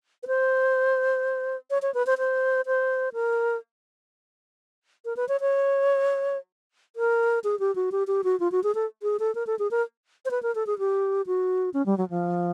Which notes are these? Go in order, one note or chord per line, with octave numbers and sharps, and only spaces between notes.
B4
C5
C#5
C#5
B4
C5
C5
C5
A#4
A#4
B4
C#5
C#5
A#4
G#4
G4
F#4
G4
G4
F#4
F4
F#4
G#4
A4
G#4
A4
A#4
A4
G#4
A#4
C5
B4
A#4
A4
G#4
G4
F#4
C#4
G3
F#3
F3